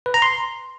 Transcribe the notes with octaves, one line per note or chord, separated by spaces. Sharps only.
B4
A#5
C6